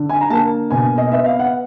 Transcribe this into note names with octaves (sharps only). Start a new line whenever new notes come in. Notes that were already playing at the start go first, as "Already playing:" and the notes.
Already playing: D3
G#5
A#5
A#3 A5
B2 G#5
D#5
B3 E5
F5
F#5